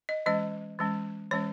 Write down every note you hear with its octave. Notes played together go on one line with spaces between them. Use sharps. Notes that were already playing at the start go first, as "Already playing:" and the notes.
D#5
E3 G#3 C#4 D#5
E3 G#3 C#4
E3 G#3 C#4 C#5